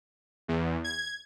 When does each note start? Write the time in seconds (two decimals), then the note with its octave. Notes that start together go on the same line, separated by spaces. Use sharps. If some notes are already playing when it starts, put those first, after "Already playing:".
0.48 E2
0.84 G#6